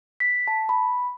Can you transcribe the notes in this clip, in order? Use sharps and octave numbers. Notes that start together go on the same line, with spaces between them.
B6
A5
B5